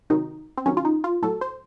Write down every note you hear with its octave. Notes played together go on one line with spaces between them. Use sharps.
C3 D#3 F#3 D#4
C4
C3 D#3 F#3 C#4
F4
D#4
F4
A2 F#3 A4
C5